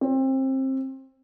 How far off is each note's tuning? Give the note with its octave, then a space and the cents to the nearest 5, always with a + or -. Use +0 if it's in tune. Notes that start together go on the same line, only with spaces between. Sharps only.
C4 +25